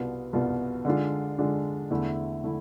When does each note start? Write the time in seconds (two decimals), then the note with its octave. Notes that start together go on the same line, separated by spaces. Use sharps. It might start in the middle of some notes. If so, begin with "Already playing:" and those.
Already playing: C2 B2 B3 F4
0.33 C2 B2 B3 F4
0.85 D3 G#3 D4 F4
1.38 D3 G#3 D4 F4
1.91 E2 D3 A3 E4
2.44 D3 A3 E4